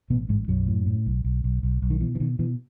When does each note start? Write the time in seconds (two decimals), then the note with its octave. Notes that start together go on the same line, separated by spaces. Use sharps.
0.10 A1 B2 B3
0.29 A1 G#2 G#3
0.48 B1 F#2 F#3
0.67 A2
0.86 A2
1.06 B1
1.24 B1
1.44 B1
1.63 B1
1.82 B1
1.90 D#3
2.01 B2 E3
2.15 E3
2.20 B2 D#3
2.39 B2 E3